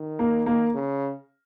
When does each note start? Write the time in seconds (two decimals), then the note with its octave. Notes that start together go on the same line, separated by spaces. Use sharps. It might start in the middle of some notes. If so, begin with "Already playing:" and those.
Already playing: D#3
0.19 A#3
0.46 A#3
0.74 C#3